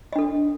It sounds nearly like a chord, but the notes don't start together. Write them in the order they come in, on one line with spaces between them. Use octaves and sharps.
D#5 D4 A4